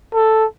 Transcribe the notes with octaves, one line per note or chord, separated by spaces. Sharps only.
A4